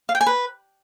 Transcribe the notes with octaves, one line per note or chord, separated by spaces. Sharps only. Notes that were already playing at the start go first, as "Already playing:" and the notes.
F5
G5
G#5
B4